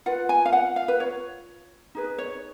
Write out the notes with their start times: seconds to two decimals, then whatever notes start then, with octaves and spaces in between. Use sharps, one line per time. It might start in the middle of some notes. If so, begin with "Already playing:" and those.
0.06 F4 B4 F#5
0.29 G#5
0.45 F5
0.53 F#5
0.76 F5
0.88 B4
1.00 C#5
1.95 D#4 G#4 B4
2.18 C#5